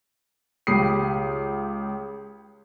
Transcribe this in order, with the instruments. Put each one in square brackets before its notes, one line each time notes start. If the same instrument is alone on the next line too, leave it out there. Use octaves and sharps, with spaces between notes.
[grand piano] C#2 G4 D#6 C7